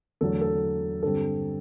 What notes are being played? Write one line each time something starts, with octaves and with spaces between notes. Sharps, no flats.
E2 D3 F#3 A3 A4
A4
G2 D3 G3 C4 A4